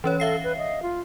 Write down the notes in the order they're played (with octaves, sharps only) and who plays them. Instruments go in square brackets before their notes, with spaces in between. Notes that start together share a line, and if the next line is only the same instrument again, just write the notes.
[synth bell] E3 C#4 C#5 [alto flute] B4
[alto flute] A4 [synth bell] E5 F5 C7
[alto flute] B4
D#5
F4